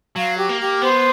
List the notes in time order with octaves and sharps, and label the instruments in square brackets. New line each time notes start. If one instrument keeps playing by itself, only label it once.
[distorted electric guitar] F#3 [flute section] F5
[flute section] G4
[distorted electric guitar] A#3
[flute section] G4
[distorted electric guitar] B3 [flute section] C5